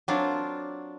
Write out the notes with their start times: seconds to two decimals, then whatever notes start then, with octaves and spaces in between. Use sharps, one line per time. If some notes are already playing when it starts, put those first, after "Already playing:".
0.08 F#3 C4 D4 F4 A#4